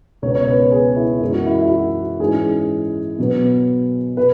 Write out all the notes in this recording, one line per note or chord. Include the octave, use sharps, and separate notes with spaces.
C#2 B2 B3 C#5
C#5
B4
B4
G#4
E4
F#2 E3 G#3
F#4
E4
E4
F#4
G#2 E3 G#3 C#4 G#4
B2 F#3 B3
B2 B4